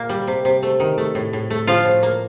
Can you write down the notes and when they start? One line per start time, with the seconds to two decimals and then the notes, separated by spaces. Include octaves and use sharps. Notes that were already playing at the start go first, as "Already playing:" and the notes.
Already playing: A#2 A#3
0.09 G3
0.27 C3
0.45 C3
0.63 A3
0.80 D#3
0.98 A3
1.15 A2
1.33 A2
1.50 A3
1.67 A2 F3 F4
1.85 A2
2.03 A#3